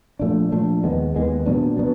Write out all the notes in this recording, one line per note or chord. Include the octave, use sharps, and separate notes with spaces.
A#2 F3 A3 D4
A#2 F3 A3 D4
D#2 D#3 G#3 B3
D#2 D#3 G#3 B3
A#2 F#3 B3 D4
F#3 B3 D4